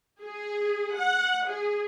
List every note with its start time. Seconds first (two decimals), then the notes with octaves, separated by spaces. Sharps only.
0.22 G#4
0.98 F#5
1.48 G#4